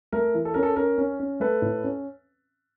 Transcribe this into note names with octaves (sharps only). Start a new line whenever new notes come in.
A3 A#4
E3
A4
C#4 A#4
A4
C#4 A#4
C#4
C#4
A3 A4 B4
A2
C#4